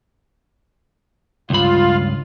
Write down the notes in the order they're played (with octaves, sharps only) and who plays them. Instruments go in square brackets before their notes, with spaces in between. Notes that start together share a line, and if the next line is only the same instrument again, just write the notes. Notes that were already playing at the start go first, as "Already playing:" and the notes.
[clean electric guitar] C#2 G2 B5 [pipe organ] F4